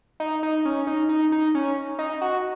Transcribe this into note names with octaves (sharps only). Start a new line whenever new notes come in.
D#4
D#4
C#4
D#4
D#4
D#4
C#4
D#4
F#4